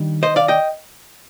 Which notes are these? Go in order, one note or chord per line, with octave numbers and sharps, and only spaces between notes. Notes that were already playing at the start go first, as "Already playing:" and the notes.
Already playing: D#3 G3 D4
C5 D#5
D5 F5
D#5 G5